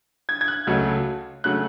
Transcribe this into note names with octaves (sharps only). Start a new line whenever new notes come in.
G#6
G#6
F#6
C#2 C#3 F#3 A3
C#3 F#3 A3 F#6